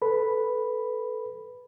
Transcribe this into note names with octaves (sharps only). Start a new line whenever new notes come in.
A4 B4 B5